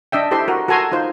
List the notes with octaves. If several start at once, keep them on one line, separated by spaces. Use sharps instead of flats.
D4 D#5 E5 G5
E4 G4 A4 C5 E5 C6
F#4 A#4
F#4 A4 A#4 G#5 A#5 C6
D#4 F4 C5